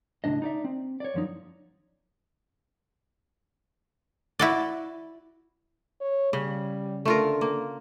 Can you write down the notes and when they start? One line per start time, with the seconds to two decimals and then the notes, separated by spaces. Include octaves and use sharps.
0.24 C#2 A2 D#3 D4 D#5
0.42 D#4 D5 E5
0.64 C4
1.00 C#5 D5
1.14 F#2 F3 D#4
4.39 E4 F#4 D5
6.01 C#5
6.33 C#3 G3
7.05 D3 A3 F4 A#4
7.41 A#3